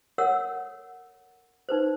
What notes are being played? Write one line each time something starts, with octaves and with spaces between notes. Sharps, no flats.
A4 A#4 C#5 F#5 E6
D#4 B4 C5